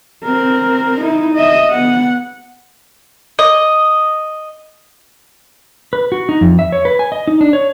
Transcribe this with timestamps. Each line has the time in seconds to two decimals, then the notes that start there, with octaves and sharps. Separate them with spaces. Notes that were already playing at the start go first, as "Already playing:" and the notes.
0.24 C4 A#4
1.01 D#4 E4
1.34 D#5 E5
1.71 B3 F#5
3.39 D#5
5.93 B4
6.12 F#4
6.29 D#4
6.41 F2
6.59 E5
6.72 C#5
6.85 B4
6.99 G#5
7.12 D#5
7.27 D#4
7.41 D4
7.53 C#5